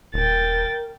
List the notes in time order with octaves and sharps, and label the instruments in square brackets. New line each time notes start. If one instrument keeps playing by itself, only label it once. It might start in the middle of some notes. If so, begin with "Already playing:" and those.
[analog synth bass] D#1 [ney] A#4 [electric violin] G5 A6